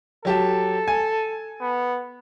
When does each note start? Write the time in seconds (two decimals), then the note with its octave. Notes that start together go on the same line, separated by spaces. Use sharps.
0.25 F#3 G4 A4 A5
0.88 G#5
1.61 B3